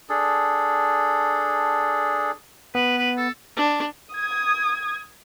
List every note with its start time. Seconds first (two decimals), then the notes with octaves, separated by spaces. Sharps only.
0.10 D4 G#4 A4
2.75 B3 B4
2.98 B4
3.17 A4
3.57 D4
4.14 D#6 G#6